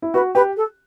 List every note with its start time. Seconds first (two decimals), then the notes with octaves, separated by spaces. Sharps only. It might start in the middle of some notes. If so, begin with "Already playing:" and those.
0.02 E4
0.14 F#4 B4
0.35 G4 B4
0.56 A4